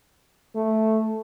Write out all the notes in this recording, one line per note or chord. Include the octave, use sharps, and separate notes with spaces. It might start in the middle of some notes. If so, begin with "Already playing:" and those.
A3